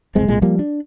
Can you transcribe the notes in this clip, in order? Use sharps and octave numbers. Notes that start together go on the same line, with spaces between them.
F#1 C2 G#3 C4
C2 A#2 G#3
F3 G3 A#3
D4